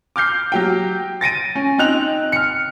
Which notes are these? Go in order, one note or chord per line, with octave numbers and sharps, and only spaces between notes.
D6 F6 G6 C7
F#3 G4 G5
A6 A#6 D7 D#7
C#4
C4 D#4 F#6 F7
F6 C#7